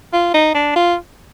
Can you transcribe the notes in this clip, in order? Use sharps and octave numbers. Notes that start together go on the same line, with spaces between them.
F4
D#4
D4
F4